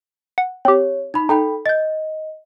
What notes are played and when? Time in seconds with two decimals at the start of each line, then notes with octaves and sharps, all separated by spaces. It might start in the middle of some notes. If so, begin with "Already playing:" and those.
0.38 F#5
0.65 C4 G4 C#5
1.14 D#4 B5
1.29 D#4 A4 G5 B5
1.66 D#5 G6 A6